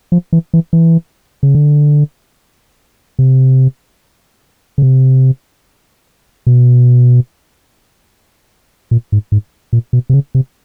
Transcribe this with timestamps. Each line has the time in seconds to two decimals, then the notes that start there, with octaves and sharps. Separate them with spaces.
0.12 F3
0.33 E3
0.54 E3
0.73 E3
1.43 C#3
1.55 D3
3.19 C3
4.78 C#3
4.82 C3
6.47 B2
8.91 A#2
9.12 G#2
9.32 G#2
9.73 A#2
9.93 B2
10.10 C3
10.13 C#3
10.35 C3